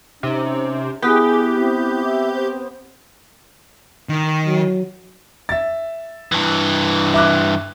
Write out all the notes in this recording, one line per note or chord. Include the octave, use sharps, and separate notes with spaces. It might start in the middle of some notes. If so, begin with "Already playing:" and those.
C3 C#4 D#4
B3 E4 G4 G#4
C4
E5
C5
D#3
F#3
E5 A6
G2 E3
E5 D6 F#6